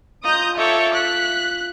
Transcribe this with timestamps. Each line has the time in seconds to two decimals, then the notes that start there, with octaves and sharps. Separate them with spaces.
0.24 F4 D#5 A#5 D#6 G6
0.57 A4 C#5 E5 D6 G6
0.94 F#6 B6